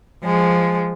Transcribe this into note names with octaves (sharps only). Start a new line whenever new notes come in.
F3 G#3